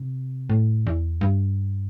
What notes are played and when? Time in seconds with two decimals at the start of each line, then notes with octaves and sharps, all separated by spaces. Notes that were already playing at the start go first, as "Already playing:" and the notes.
Already playing: C3
0.50 A2
0.87 E2
1.21 G2